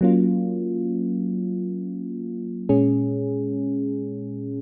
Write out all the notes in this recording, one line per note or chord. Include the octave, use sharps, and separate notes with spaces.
F#3 A#3 C#4 F4
A#2 G#3 C#4 G#4